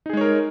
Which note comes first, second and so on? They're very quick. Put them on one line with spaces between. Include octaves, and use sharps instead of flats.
D#4 G#4 G#3 C#5 A#4